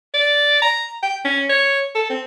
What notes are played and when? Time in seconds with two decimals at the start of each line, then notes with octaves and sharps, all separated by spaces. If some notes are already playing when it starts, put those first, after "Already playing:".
0.14 D5
0.62 A#5
1.02 G5
1.24 C#4
1.49 C#5
1.95 A4
2.10 C4